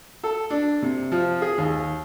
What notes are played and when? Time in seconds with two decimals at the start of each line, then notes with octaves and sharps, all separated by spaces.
0.24 A4
0.50 D4
0.82 C3
1.12 F3
1.42 G#4
1.58 D#2